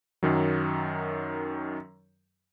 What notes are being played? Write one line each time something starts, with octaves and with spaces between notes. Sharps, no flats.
F#2 D#3 F#3